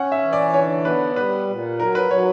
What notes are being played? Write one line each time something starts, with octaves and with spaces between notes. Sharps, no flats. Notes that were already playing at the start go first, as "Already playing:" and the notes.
Already playing: C#4 F#5
E5
E3
D5
D3 C#5
B3 B4
G3 B4
A#2
F#3 A#4
B4
F#3 C#5